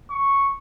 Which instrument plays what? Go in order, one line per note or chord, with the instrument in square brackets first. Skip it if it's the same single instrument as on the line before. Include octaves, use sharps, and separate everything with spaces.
[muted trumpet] C#6